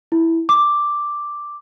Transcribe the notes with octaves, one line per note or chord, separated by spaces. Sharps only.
E4
D6